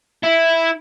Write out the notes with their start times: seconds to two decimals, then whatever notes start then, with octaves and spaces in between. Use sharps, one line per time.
0.23 E4